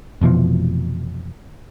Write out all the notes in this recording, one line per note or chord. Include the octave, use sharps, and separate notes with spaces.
F1 B2 E3 F3